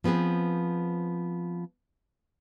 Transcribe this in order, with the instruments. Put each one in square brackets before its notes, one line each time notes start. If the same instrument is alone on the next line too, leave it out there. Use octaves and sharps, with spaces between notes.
[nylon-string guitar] F3 B3 C4 G#4 B4